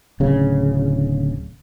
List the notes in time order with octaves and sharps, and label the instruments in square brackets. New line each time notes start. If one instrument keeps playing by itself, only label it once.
[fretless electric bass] D1 C#3